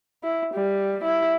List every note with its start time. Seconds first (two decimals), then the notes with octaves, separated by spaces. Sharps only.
0.24 E4
0.54 G3
1.04 E4